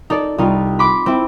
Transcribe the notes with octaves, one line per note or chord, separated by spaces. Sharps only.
D#4 A4 D5
C2 D#4 F4
B5 C6 D6
C4 E4